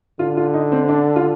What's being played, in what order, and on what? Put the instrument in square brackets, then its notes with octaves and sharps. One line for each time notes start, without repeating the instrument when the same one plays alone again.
[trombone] D3 [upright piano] F4
[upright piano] F4
D#4
C4
D4
F4